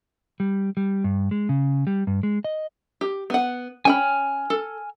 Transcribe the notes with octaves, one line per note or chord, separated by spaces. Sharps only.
G3
G3
G2
G#3
C#3
G3
G2
G#3
D#5
G4
B3 F#5
C#4 G5 G#5 B5 F6
A4